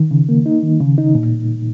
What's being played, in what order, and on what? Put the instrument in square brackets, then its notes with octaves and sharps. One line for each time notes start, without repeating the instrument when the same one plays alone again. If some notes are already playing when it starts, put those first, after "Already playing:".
Already playing: [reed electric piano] D#3
C#3
A#3
D#4
D#3
C#3
D#4
A#2